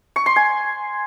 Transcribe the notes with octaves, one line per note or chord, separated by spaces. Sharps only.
C#6
C6
G#5